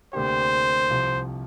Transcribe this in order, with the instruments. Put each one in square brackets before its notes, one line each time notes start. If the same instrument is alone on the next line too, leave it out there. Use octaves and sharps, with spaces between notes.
[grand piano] D2 C3 A#3 D4 G4 [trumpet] C5
[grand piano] C2 C3 F3